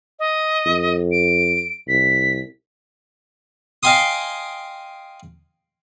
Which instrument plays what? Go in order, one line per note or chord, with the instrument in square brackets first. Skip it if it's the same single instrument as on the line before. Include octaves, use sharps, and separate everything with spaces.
[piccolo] D#5
[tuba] F2
[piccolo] D7
[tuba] C2 [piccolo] B6
[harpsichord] D#5 F5 G5 G#5 C6 D#6